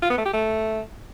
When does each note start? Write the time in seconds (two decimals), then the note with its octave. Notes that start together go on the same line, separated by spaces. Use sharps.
0.02 F4
0.10 B3
0.18 A3
0.25 G4
0.33 A3